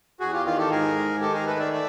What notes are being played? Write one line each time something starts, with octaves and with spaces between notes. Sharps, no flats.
E2 F#4 G#4
F4 G4
D#3 F4
G4 A4
G#2 G#4 A#4
G#3
D#3 G4 A4
G#4 A#4
A3 A4 B4
D5 E5
D5 E5